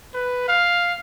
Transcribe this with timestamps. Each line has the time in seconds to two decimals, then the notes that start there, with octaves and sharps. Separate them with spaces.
0.14 B4
0.48 F5